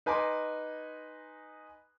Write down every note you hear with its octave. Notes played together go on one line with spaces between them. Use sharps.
D#4 B4 G#5 A#5 C6 D6